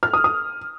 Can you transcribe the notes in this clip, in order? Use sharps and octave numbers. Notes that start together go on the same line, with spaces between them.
F6
D#6
D#6